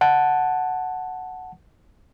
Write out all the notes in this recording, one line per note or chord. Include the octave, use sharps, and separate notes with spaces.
F#5 A5